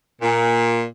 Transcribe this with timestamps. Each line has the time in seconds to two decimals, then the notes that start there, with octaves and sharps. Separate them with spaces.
0.22 A#2